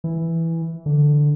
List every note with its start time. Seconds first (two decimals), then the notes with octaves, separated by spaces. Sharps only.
0.04 E3
0.86 D3